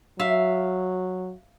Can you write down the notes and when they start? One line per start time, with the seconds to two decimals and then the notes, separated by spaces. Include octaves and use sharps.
0.19 F#3 E5 F5